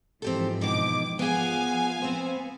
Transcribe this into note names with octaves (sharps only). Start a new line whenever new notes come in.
G#2 E3 F3 C4 G4 A4
B2 D#3 D6
F3 B3 G#4 F5 G#5
B3 C4 C5